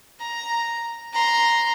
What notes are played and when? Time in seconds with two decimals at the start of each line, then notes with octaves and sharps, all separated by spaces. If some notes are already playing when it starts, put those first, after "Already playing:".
0.19 A#5
1.13 A#5 C6